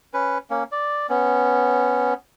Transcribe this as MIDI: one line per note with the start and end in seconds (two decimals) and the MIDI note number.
0.14 0.38 61
0.14 0.38 71
0.50 0.64 58
0.50 0.64 61
0.72 1.07 74
1.09 2.14 59
1.09 2.14 61